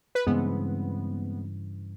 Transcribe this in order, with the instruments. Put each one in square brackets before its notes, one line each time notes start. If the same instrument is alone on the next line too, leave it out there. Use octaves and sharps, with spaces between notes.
[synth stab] B4
[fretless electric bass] G2 C#3 E3 [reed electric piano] G#3 C4 [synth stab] B3